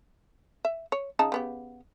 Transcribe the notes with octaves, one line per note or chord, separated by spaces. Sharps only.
E5
C#5
C#3 D#4 A5
C#3 B3 G4